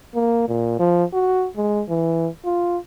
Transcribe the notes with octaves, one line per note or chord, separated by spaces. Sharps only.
A#3
A#2
F3
F#4
G#3
E3
F4